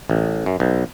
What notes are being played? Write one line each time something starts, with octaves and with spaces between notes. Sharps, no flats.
A1
F#2
B1